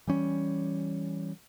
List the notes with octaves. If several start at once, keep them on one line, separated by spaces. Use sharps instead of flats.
E3 G3 C#4